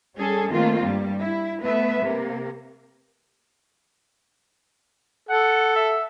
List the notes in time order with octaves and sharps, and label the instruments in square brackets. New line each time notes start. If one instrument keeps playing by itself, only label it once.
[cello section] G3 C#4 G#4 A4
D#3 A3 A#3 C4 F4
G2 G3
E4
A3 B3 B4 E5
C3 A#3
[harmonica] A4 [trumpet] F#5
[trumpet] E5